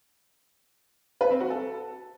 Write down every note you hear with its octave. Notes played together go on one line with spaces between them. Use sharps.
B4
C4
F#4
A4